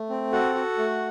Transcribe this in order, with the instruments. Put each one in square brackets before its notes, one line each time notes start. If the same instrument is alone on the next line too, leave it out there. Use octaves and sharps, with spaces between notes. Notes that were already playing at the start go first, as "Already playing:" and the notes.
Already playing: [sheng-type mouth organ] A3
C4
F#4 A4 F#5
F#4
A3